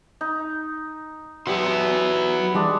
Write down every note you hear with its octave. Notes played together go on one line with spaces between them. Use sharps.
D#4
F#3 B3 E4 F#4 G4 C6
E3 G3 G#3 D4